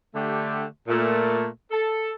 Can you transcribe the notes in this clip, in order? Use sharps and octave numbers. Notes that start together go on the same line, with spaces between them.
D3 A3 G4
A#2 A3
A4